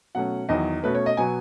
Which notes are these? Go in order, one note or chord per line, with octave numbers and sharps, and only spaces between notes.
B2 F#3 A3 C#4 F#5
E2 D#3 F#3 D#5
B2 A3 C#4 B4
C#5
D#5
B2 F#3 B3 G#5